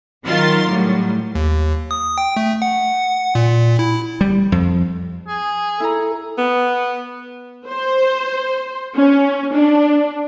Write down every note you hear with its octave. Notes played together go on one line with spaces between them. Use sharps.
D#3 F#3 F4 A#4 C6 A6
A2 F#3 G3
D#2
D#6
G5
A3
F#5
A#2
E4
G3
F2
G#4
E4 A4 A#5
B3
C5
C#4
D4